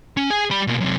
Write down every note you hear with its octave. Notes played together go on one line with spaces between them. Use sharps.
C#4
G#4 G#5
G3 B5
B2 A#3
F#2 C3